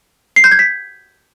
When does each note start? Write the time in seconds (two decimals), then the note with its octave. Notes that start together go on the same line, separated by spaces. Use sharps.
0.36 C7
0.44 G6
0.51 G#6
0.59 B6